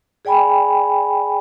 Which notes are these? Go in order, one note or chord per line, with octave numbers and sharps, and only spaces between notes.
G#4 D5 G5 G#5 B5